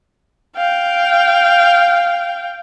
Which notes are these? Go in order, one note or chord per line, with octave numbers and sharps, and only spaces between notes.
F5 G5